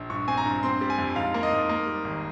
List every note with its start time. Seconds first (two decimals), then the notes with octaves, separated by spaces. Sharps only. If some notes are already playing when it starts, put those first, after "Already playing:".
Already playing: A#1
0.10 G2 C#6
0.28 C4 G#5
0.37 A#5
0.46 G2
0.63 C4 C6
0.81 G3
0.90 G#5
0.98 F2
1.16 G#2 F5
1.34 A#3
1.43 D#5
1.52 G#2
1.69 A#3
1.87 G3
2.04 G#1